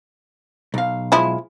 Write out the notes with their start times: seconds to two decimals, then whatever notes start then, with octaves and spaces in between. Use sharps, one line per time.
0.74 B1 F5
1.12 F3 G#3 E4